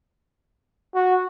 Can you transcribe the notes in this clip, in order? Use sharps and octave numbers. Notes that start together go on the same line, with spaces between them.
F#4